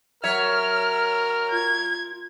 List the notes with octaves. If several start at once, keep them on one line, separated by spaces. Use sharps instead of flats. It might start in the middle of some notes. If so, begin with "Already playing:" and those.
F#3 A#4 C#5 E5 F6
F4 G#6